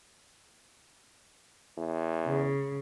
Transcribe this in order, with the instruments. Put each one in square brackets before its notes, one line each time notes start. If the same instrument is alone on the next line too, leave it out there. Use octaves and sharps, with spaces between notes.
[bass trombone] E2
[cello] C#3